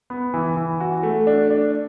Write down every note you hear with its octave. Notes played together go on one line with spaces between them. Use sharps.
B3
E3
E3
F#4
A3
D4
D4